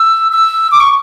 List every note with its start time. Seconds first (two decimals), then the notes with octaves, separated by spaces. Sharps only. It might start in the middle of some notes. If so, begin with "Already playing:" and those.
Already playing: E6
0.32 E6
0.72 D6
0.80 C#6